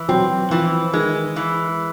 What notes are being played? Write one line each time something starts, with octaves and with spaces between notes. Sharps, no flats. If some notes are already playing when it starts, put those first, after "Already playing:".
Already playing: E3
F#3 C4
E3 F3
D#3 G#3
E3